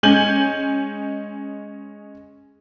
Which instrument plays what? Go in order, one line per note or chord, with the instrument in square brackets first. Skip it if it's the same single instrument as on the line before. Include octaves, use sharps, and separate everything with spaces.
[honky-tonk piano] G#3 C#4 G#5 G6 F#7